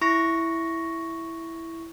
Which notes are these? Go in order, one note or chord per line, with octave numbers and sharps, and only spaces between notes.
E4 C#6 A#6